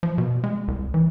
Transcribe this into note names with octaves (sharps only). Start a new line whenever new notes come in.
F3
B2
G#3
C2
E3